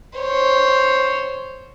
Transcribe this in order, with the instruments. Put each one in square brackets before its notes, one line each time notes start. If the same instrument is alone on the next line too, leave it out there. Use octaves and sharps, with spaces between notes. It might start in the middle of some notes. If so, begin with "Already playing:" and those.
[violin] C5 C#5